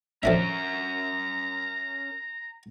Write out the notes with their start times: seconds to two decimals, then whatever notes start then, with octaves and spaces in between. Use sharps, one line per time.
0.23 F2 C#4 D4 A#4 E5 A#5